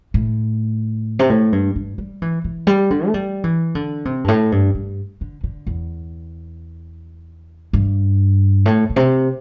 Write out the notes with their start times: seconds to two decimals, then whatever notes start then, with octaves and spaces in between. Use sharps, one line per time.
0.14 A2
1.19 C3
1.30 A2
1.52 G2
1.76 G2
1.98 G3
2.22 E3
2.44 E3
2.67 G3
2.90 D3
3.07 A3
3.14 G3
3.44 E3
3.75 D3
4.05 C3
4.24 G2
4.28 A2
4.52 G2
4.75 G2
5.21 D3
5.44 D3
5.67 E2
7.73 G2
8.66 A2
8.90 A2
8.96 C3